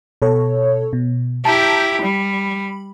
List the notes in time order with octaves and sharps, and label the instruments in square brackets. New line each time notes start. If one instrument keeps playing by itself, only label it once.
[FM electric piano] B2 A4 C#5
B2
[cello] E4 G4 [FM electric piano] A5 A#5 G6
[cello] G3 [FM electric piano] B5